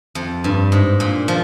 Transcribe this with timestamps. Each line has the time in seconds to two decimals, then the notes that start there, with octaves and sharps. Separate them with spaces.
0.15 F2
0.44 G2
0.72 G#2
1.00 A#2
1.28 F3